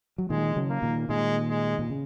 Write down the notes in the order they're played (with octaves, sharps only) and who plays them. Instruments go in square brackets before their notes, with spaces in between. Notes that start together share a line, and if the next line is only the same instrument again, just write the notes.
[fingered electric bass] F#3
[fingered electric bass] A#2 D#3 [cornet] G#3
[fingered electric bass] C#3 F#3
[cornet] A#3
[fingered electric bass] A#2 D#3
[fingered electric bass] A#2 D#3 [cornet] G#3
[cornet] G#3
[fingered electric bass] A#2
C#3